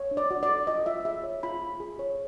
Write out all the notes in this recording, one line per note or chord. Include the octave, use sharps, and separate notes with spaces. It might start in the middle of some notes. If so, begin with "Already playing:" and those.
Already playing: C#5
D4
D5
F#4
D5
A4
F4 D#5
F4 E5
G#4 E5
C#5
F4 B5
F4
G#4
C#5